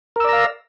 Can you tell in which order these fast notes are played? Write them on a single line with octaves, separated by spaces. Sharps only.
A#4 E6 D5 A#5 F5